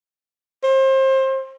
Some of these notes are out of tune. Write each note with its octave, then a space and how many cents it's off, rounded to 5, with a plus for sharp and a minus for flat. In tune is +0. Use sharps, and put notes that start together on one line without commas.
C5 +30